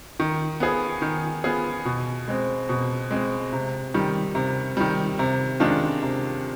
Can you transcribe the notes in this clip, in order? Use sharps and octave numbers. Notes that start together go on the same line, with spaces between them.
D#3
B3 F4 G#4
D#3
B3 F4 G#4
B2
G#3 C4
B2
G#3 C4
C3
D#3 G3
C3
D#3 G3
C3
D#3 G#3 D4 F4
C3